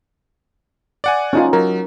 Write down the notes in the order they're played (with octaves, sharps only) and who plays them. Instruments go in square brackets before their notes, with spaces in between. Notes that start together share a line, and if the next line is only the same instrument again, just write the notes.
[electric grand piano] D5 F#5 G#5
[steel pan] C#4 D#4 F4
[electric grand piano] F#3 [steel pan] A#4